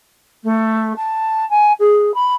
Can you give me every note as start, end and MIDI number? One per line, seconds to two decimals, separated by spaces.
0.44 0.96 57
0.96 1.48 81
1.50 1.73 80
1.79 2.14 68
2.14 2.34 83